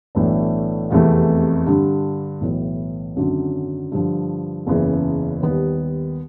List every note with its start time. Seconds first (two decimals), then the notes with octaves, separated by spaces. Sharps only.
0.15 B1 A2 E3 A3 D4
0.90 F1 E2 C3 E3 A3
1.67 G2 D3 G3
2.41 B1 A2 E3
3.16 G#1 F#2 D3 F#3
3.92 G2 D3 F3
4.67 F#1 E2 C#3 E3
5.42 D#2 D#3 G3 B3